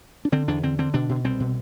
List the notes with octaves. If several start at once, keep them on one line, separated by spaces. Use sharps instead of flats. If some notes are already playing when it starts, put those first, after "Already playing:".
D4
D3 C4
E2 D4
D3 C4
D3 C4
B2 D4
B2
C2 C4
B2